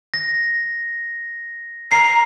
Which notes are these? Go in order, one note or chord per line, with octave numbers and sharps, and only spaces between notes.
A#6
A#5 C7